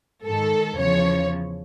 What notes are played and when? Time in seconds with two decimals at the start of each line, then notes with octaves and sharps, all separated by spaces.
0.24 G#2 D#3 A4
0.77 E2 C#3 F3 C#5